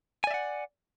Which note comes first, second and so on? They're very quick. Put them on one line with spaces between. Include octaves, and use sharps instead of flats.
G#5 D5 E5 F#5